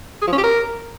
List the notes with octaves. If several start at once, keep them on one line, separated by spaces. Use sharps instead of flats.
G#4
F3
C#4
G4
A#4